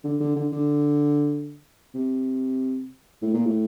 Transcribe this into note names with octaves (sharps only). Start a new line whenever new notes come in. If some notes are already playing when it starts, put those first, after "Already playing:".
D3
D3
D3
D3
C3
A2
A#2
A2